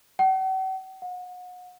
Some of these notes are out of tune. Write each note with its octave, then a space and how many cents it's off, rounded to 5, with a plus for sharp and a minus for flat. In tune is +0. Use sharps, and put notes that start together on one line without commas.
F#5 +45
F#5 -35